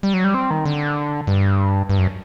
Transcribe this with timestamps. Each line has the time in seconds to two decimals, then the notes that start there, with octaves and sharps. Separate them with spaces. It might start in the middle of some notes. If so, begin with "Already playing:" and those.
0.03 G3
0.14 F#3
0.24 G3
0.34 C4
0.51 D#3
0.65 D3
1.27 G2
1.89 G2
1.98 F#2